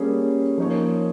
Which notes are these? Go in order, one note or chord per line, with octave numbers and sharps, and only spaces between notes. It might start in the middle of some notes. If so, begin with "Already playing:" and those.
Already playing: G3 A#3 C#4 G#4
F3 A#3 D#4 A#4 C#5